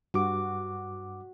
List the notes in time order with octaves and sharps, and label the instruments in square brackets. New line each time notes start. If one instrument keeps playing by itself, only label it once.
[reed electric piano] G2 D6 [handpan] F#4